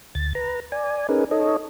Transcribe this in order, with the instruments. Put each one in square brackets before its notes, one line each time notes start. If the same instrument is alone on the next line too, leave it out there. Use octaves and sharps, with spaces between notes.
[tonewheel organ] D2 A6
B4 A#5
D5 G#5
C#4 D#4 G#4 A#4 B4
D#4 A4 C#5 D#5